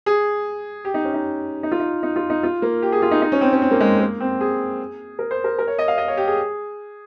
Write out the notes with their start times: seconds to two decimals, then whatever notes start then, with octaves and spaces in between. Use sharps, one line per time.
0.06 G#4
0.85 G4
0.94 D#4
1.04 C#4
1.14 D#4
1.63 D#4
1.72 F4
1.80 D#4
2.03 D#4
2.16 F4
2.30 D#4
2.43 F4
2.62 A#3
2.82 G4
2.92 G#4
3.02 F4
3.11 D#4
3.22 D#4
3.32 C#4
3.41 C4
3.53 C#4
3.62 C4
3.71 A#3
3.80 G#3
4.00 A#3
4.20 C4
4.40 G#4
5.19 A#4
5.31 C5
5.44 A#4
5.59 A#4
5.67 C#5
5.78 D#5
5.88 F5
5.98 D#5
6.08 C#5
6.17 G4
6.28 G#4